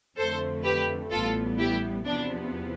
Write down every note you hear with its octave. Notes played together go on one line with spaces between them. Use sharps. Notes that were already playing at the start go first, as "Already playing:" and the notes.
F2 D3 A3 A4 C5
G4 B4
A1 A2 G3 B3 F4 A4
E4 G4
E2 C3 F3 B3 D4